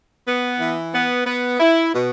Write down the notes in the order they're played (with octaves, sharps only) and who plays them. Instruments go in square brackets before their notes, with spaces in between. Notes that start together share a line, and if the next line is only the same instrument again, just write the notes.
[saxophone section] B3
E3
B3
B3
E4
B2